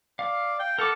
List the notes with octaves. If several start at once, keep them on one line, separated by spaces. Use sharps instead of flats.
D5 F5
G5
A4 A#4 F#5 D6